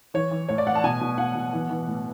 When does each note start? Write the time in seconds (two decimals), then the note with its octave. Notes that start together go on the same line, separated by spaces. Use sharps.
0.14 E3 C#5
0.31 E3
0.49 A2 C#5
0.58 D5
0.66 A2 F#5
0.75 A5
0.84 B2 G#5
1.01 B2
1.18 B2 F#5
1.35 B2
1.53 E3
1.70 E3
1.87 A2